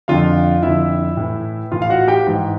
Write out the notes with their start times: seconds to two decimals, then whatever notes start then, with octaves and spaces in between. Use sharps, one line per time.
0.08 F2 D3 F4 F5
0.62 F2 D3 E4 E5
1.17 A2 E3
1.72 A2 E3 F4 F5
1.82 F5
1.90 F#4 F#5
2.08 G4 G5
2.27 G#2 E3